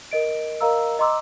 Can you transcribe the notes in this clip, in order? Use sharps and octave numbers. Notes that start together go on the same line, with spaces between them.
A#4 D#5 D7
A#4 D#5 F5 A#5 E6
D#5 A#5 C6 D6 E6